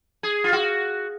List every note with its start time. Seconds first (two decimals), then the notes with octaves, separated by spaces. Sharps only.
0.23 G#4
0.44 F4
0.52 F#4